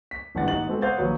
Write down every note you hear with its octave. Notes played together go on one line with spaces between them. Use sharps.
B6
D#1 A1 G2 E4 F#5 A6
D#2 D#4 F#5 A6 F#7
G#3 B3 C4 F#4 A4
C5 F5 F#5 D#6 G6 A6
A#1 D#2 F#3 B4 C#5